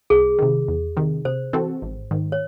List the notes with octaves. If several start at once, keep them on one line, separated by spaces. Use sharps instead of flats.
C2 G#4
C3 D#3
E2
C3 D#3
C3 C5
E3 C4 F#4 A4
G#1
G#2 D#3
C#5